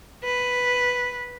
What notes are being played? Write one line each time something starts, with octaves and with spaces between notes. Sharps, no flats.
B4